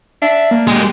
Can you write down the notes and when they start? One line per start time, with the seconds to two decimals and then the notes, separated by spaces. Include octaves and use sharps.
0.22 D4 E5
0.51 A#3
0.67 G#3 G4